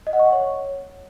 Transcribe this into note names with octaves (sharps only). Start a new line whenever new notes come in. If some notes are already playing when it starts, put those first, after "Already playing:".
D#5
F#5
C#6
F#5
C#5